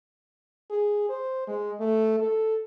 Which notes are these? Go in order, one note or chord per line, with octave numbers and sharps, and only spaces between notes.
G#4
C5
G#3
A3
A4